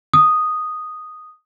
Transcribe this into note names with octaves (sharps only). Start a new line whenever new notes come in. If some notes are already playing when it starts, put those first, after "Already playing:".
D#6